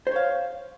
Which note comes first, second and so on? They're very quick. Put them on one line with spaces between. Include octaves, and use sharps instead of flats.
C5 C#5 F5